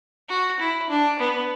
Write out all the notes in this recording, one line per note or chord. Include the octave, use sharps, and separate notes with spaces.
F#4
E4
D4
B3